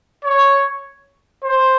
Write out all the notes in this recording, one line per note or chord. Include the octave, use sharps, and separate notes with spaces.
C#5
C5